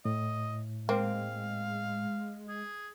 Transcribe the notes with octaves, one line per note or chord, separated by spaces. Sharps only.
A2 D#5
G#3 A#3 C4 F5
G#4